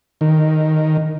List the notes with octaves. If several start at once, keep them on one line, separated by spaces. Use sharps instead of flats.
D#3